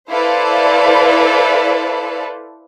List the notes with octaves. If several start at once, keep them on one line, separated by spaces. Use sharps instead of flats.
E4 A4 B4 C5 D5 F5